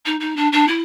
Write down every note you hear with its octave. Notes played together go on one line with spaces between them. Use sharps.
D#4
D#4
D4
D4
E4